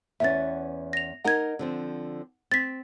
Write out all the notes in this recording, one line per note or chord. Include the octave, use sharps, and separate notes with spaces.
E2 B3 C#4 E5 A6
A#6 F7
D#4 A#4 D#5 F#5 G#6
D3 F3 C4
C4 A6 B6